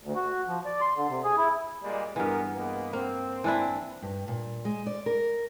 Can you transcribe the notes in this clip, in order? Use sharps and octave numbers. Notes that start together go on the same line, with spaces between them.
D2
F#4
F3
D5
C6
D3
C3
G#4
E4
A#2 G3 G#3
G2 E3 B3 G#4 A#4
G#3 A#3 B3
A#3 C4
E3 D4 E4
G2
A#2
G#3
D5
A#4